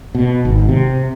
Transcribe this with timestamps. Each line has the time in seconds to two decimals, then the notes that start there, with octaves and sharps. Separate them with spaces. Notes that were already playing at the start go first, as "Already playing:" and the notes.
0.15 B2
0.45 G#1
0.69 C3